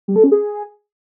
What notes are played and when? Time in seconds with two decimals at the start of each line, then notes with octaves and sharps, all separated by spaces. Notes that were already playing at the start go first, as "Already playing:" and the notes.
0.08 G3
0.16 A4
0.24 C#4
0.32 G#4